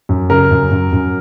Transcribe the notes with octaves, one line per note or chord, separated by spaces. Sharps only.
F#2
C#3 A#4
F#2
F#2
F#2